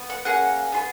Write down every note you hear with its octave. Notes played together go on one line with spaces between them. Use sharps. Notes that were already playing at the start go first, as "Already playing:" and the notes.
Already playing: B3
F#5
A#3 C#4 G#4 F#5
B3 F4 G#4